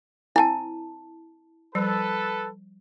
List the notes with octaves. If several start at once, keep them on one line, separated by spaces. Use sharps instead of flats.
C4 E4 G#5 A5
F3 G3 A4 B4